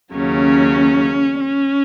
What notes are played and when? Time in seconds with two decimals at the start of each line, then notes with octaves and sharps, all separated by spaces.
0.14 D#2 C#3 F#3 C#4
1.39 C#4